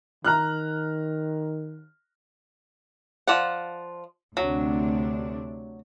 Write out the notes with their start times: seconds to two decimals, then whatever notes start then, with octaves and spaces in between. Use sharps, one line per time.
0.25 D#3 A#5 F6 F#6
3.27 F3 D5 F#5
4.37 D2 C3 F#3 D4